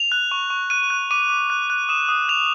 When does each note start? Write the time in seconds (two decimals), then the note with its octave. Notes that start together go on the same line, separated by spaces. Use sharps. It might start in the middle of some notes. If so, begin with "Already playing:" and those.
Already playing: F7
0.12 F#6
0.31 C#6
0.50 C#6
0.70 F#6 D#7
0.90 F#6
1.11 D6 D#7
1.29 D6
1.50 F#6
1.70 F#6
1.89 D#6 E7
2.09 D#6
2.29 F#6 F7